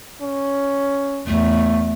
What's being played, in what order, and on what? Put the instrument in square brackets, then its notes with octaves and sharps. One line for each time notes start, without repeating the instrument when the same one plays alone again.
[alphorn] C#4
[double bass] E2 [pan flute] A3